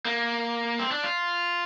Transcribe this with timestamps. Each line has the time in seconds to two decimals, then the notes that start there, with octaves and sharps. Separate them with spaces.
0.05 A#3
0.79 C4
0.91 D4
1.04 F4